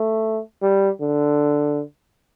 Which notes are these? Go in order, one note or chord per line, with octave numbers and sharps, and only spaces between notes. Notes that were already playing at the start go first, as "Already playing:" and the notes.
Already playing: A3
G3
D3